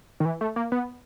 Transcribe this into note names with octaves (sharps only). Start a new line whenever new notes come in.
D#3
E3
A3
A#3
B3